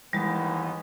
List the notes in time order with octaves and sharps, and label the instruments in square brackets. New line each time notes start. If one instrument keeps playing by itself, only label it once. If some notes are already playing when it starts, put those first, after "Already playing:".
[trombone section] D#2 G#2 B3 [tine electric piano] E3 G5 [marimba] G3 G#3